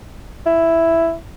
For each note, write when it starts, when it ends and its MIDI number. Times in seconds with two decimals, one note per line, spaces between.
0.46 1.15 64